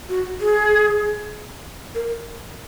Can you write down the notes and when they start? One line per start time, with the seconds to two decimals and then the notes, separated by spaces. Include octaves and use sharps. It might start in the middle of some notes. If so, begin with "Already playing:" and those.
0.09 F#4
0.40 G#4
1.95 A#4